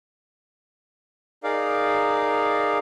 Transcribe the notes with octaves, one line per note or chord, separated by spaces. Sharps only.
D#4 G#4 A#4 D5 F5